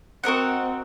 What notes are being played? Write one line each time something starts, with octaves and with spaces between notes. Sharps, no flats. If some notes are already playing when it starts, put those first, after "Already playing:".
C4 F#4 A#4 D#5 F#5